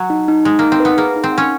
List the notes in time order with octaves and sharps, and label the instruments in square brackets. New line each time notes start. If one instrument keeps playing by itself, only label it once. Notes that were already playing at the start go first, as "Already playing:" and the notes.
Already playing: [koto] F#3
[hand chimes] D#4
D#4
[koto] G#3 [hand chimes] D#4
[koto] A#3 [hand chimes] D#4
[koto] C4
[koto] B3 [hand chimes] B4
[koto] A#3 [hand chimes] G#4
[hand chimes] D#4
[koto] C4
[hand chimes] F#5
[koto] C#4